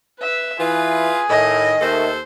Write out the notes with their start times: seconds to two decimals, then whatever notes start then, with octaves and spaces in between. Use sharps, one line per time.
0.20 B4 E5
0.59 E3 F4 G#4 B4
1.30 A2 D#3 D#5
1.81 D#2 D#3 A3 A4 C5